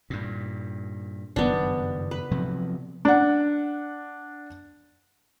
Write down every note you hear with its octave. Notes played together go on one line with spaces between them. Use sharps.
G2 A#2
F#1 G2 D#3 B3 D4
B4
C3 F3 F#3
D4 F#5